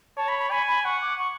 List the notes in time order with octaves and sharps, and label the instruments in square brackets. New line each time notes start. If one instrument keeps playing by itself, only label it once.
[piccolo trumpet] C#5 [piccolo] A5
[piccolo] B5
B5
[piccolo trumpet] G#5 [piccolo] B5
[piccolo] B5
[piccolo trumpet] F#5 [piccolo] C#6
[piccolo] D6
C#6